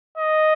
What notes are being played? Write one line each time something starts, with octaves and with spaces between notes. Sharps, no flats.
D#5